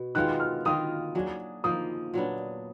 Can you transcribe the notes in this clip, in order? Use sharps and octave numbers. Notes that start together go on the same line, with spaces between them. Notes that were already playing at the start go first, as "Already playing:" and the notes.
Already playing: B2
D#3 G#3 B3 F4 F#6
F6
D#3 A#3 F4 D#6
F#3 D4 G#4
F3 A#3 D#4 D#6
A#2 F#3 B3 D4